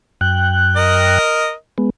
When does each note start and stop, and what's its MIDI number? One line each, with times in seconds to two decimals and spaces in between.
0.21 1.18 42
0.21 1.18 79
0.21 1.18 90
0.76 1.53 70
0.76 1.53 75
1.78 1.90 56
1.78 1.90 59